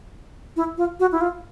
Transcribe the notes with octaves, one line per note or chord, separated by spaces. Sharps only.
E4
F4
F#4
E4
F4